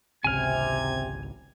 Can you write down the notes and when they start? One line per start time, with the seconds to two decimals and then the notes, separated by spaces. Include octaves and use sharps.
0.24 G#1 C#2 C3 G#5 F6 G#6